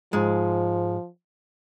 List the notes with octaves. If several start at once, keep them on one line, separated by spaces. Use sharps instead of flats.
G#2 F3 G#3